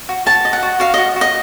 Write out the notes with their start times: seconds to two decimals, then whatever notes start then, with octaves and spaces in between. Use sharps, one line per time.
0.09 F#4
0.26 F#4 A5
0.45 D#5
0.53 F#5
0.63 F#4
0.80 F#4 F5
0.94 F#4 D#5
1.16 F#4
1.21 D#5